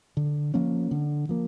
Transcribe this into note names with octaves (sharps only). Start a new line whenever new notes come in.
D3
F3 A#3 C#4
D3
F3 A#3